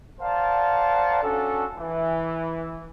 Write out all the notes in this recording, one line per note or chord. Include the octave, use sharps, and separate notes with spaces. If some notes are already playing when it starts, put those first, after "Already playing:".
A#4 C5 D5 F5 F#5 A5
C#4 D4 F#4 A4
E3